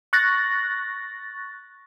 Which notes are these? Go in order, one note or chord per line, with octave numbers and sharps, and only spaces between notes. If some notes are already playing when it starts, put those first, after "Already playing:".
C#6 F#6 A6 A#6